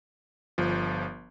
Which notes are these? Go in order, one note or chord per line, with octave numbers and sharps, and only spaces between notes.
G1 F3